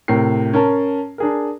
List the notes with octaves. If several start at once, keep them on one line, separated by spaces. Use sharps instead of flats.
A2 C3 A#4 C7
C#4 A#4 A5
D4 G#4 A#4